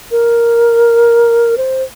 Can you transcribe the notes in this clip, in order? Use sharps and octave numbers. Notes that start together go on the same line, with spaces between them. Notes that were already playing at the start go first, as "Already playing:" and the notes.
A#4
C5